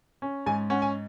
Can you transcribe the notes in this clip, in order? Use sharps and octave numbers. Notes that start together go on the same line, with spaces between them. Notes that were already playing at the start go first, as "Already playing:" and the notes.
C#4
G#2 G#5
C#4 F#5
G#5